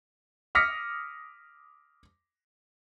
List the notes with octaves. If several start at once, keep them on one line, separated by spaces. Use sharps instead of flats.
D6 D#6 F6 A#6 B6 C#7